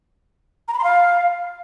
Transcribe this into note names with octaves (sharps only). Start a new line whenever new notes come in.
A#5
B5
C6
F5